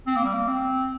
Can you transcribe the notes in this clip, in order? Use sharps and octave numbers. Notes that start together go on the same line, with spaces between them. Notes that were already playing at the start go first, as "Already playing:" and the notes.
C4
A#3
G3
A#3
C4